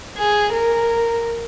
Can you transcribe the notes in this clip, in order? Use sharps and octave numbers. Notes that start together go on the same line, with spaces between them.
G#4
A#4